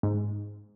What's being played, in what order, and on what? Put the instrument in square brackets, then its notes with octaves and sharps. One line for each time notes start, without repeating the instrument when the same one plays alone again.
[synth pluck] G#2